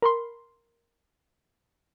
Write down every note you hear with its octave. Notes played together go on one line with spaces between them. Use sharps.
A#4 B5 C6